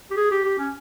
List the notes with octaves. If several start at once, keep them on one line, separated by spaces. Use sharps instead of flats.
G4
G#4
G4
G4
C#4